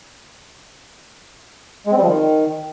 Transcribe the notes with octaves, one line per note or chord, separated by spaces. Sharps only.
G#3
C4
G3
F3
D#3